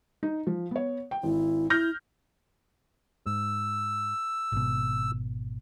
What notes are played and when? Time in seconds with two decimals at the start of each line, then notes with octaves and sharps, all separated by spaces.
0.23 D#4
0.47 F3
0.71 B3 C#5
1.11 G5
1.23 G#1 E4
1.70 E4 F6 G6 A#6
3.26 G#2 E6
4.52 G#1 B2